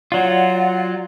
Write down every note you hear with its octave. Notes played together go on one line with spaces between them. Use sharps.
F#3 F4 D5 F#5